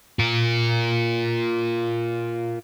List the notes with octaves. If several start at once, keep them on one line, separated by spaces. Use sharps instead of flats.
F4 A#4